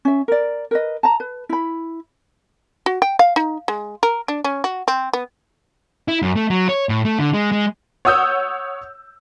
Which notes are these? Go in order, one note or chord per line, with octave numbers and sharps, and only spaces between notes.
C#4 E5
A#4 D5
A#4 B4 D#5
A5 A#5
B4
E4 B5
F#4
G5
F5
D#4
G#3
A#4
D4
C#4
F#4
C4
B3
E4
F#2
A3
F#3
C#5
A2
A3
D3
G#3
G#3
C#5 F#5 D#6 E6 G6